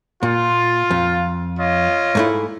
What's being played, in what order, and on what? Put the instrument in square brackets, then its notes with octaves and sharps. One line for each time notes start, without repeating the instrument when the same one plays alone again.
[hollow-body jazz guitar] A#2 [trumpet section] F4
[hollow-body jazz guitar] F2
[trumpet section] F4 C#5 D#5
[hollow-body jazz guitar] G#2 A3 E4